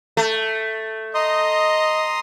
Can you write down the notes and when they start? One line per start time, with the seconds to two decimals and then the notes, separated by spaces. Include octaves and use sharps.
0.17 A3
1.15 D#5 A#5 C6 D#6